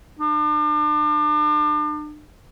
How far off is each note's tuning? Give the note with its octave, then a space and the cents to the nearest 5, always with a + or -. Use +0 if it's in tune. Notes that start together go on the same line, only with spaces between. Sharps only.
D4 +35